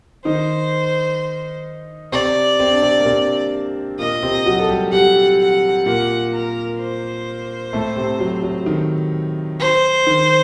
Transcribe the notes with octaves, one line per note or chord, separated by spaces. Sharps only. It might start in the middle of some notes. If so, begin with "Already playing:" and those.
D#3 D#4 C5
C3 C4 D5
C4
D4
C3 C4
A#3
C3 C4
A#2 A#3 D#5
C3 C4
F#3 F#4
A4
G3 G4
G3 G4 F#5
F#5
A#2 A#3 F#5
A#4
C5
A2 A3
C3 C4
F#3
F#3
D#3
C5
D#3